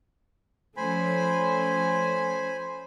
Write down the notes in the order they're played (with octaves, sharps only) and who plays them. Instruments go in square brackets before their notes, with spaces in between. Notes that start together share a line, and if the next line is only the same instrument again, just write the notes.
[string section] F3 A3 C#4 [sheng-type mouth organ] C5 G#5 B5